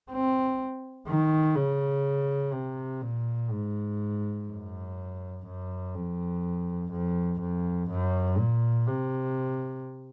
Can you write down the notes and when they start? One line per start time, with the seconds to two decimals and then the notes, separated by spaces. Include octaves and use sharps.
0.10 C4
1.07 D#3
1.55 C#3
2.53 C3
3.02 A#2
3.51 G#2
4.48 F#2
5.46 F#2
5.94 F2
6.92 F2
7.41 F2
7.90 F#2
8.38 A#2
8.87 C3